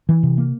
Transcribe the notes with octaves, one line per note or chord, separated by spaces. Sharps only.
E3
C3
A#3